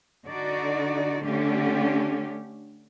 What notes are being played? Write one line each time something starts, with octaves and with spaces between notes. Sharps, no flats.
D3 D#4 F#4 D5
D3 A3 C#4 G4